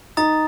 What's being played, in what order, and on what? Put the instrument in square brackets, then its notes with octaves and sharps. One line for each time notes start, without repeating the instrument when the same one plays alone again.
[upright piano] D#4 [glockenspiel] A#5 D#6 A6